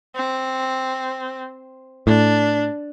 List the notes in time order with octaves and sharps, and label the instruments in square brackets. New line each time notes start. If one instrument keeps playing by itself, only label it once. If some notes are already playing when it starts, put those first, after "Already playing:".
[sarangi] C4
[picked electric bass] A2 [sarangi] D4